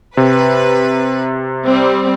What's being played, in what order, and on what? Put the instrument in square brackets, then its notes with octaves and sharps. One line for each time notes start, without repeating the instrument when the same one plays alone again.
[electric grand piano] C3 [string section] B4
[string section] G3 C4